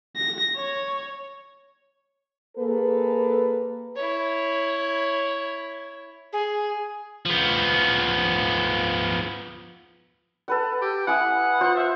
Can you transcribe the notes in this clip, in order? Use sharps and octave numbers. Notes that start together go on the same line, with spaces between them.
A#6
C#5
A#3 G#4 A4 B4
E4 C#5
G#4
F3 B3
A4 B4 F#5
G4
E4 F#5 G#5 D#6
F4 C5
E5